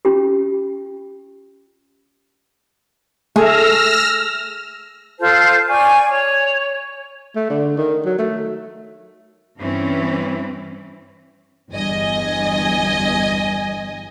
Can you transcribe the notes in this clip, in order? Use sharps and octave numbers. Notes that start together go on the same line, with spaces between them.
C#4 F4 G4
A3 G#4 E6 F6 A#6
F4 A4 C5 A5
D5 G#5 C#6
C#5
A3
D3
D#3
F#3
A3
G2 E3 C4 C#4
G1 E2 G2 D#5 G#5